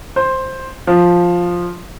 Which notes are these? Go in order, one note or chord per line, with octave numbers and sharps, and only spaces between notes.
C5
F3